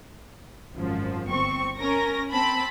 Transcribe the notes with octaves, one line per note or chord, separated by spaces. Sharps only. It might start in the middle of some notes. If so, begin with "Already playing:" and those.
G#1 F#2 F3
G1 C4 C#6
C#4 A#4 A#6
C4 A5 B5